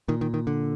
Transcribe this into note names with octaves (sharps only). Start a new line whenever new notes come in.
A#2 D#3
D#3
D#3
D3